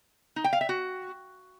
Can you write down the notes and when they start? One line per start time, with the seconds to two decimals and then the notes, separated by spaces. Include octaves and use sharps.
0.36 D#4
0.44 G5
0.53 F5
0.61 E5
0.69 F#4